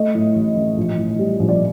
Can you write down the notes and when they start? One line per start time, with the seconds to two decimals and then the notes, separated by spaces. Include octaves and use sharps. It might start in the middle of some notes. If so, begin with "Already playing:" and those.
Already playing: A3 D#5
0.15 A2
0.35 A1
0.56 A1
0.77 A#1
0.98 A2
1.19 G3
1.40 A#1
1.49 D5